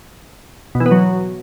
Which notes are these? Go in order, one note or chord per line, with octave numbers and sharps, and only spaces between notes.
B2
E3
B3
F#3